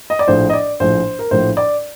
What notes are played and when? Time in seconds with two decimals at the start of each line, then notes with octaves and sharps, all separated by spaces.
0.10 D#5
0.19 D5
0.28 A#1 A2 F3 C5
0.50 D#5
0.53 D5
0.80 A#1 A2 F3 C5
1.19 A#4
1.31 A#1 A2 F3 C5
1.57 D5